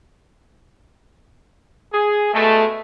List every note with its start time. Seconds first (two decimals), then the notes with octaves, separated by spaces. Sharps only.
1.93 G#4
2.34 B2 G#3 A3